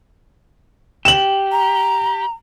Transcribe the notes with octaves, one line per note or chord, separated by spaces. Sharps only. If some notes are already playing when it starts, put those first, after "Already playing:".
G4 E7 F#7
A#5